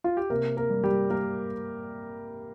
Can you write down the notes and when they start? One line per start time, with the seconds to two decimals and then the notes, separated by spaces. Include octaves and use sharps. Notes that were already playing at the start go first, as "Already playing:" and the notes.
0.04 F4
0.17 G4
0.30 C3 A#3 A#4
0.57 A#3 A#4
0.70 G3
0.83 G3 G4
1.10 G3 A#3 A#4